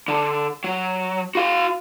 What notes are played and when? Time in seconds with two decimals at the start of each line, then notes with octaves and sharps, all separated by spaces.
0.08 D3
0.64 F#3
1.35 F#4 F5